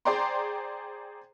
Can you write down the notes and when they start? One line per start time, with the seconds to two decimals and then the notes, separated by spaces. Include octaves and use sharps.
0.05 G#4 C5 D5 G5 A#5 C6